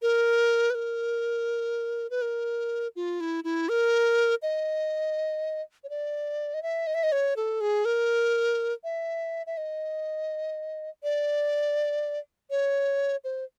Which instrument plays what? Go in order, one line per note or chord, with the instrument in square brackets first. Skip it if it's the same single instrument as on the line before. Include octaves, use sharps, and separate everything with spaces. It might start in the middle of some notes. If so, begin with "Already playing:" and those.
[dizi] A#4
B4
A#4
B4
A#4
F4
E4
E4
A#4
D#5
C#5
D5
D#5
E5
D#5
E5
D#5
C#5
A4
G#4
A#4
E5
E5
D#5
D5
C#5
C5